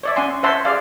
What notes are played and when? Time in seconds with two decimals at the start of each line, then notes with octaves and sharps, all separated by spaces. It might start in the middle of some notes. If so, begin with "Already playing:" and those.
0.03 C#5 D5 E5
0.16 C#4 F#5 G#5 C6
0.43 C5 C#5 E5 F#5 A5 C6
0.65 G#4 D5 F5